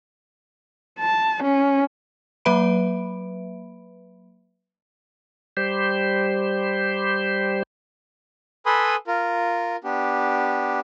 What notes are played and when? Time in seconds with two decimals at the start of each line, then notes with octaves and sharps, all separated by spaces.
1.00 A5
1.43 C#4
2.45 F#3 A#3 B4 E5 B5 D7
5.57 G3 G4 C5
8.66 A4 B4 G#5 B5 C6 D#6
9.07 F4 A#4
9.84 B3 D4 G4